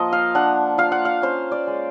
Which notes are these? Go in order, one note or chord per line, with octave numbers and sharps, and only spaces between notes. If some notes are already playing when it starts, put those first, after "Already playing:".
Already playing: F3 A#3 D#5
F5
D4 F#5
F4 F5
F#5
F5
C#4 C5
D5
G#3